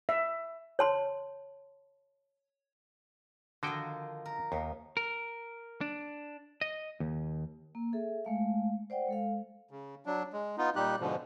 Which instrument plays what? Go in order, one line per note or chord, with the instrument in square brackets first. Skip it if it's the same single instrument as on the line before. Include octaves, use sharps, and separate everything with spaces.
[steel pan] E5
[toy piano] C#5 A5 C6
[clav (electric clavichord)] D3 F#4 G5 [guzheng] D#3 F3 D#5
[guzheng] A#4
[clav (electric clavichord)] D#2 [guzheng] B3
[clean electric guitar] A#4
D4
D#5
D#2
[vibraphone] A#3
G#4 A4 E5
G#3 A3 F5
C5 D5 F#5 G5
G#3 A4 F5
[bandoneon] C#3
F#3 D4
G#3
B3 D#4 F4
A#2 G3 D#4 G4 F#6
G#2 B2 D3 F3